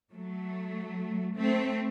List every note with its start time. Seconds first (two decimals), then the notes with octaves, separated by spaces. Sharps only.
0.13 F#3 A3
1.37 A3 C4